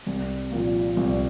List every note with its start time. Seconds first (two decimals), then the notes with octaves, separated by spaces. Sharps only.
0.06 C2
0.52 A#2 F3 A#3
0.97 C2